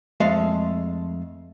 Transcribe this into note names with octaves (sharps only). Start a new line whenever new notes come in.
F2 G#3 A3 F5